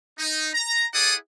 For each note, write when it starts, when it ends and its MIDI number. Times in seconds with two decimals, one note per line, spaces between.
0.19 0.48 63
0.54 0.85 82
0.94 1.15 64
0.94 1.15 68
0.94 1.15 69
0.94 1.15 74
0.94 1.15 78
0.94 1.15 87